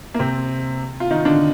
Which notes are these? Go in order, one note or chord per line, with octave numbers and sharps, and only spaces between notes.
A#3
C3 C4
F4
D#3 D#4
D3 D4